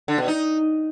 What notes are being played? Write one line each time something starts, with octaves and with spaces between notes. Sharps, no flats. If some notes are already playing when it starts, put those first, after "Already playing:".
D3
B2
D#4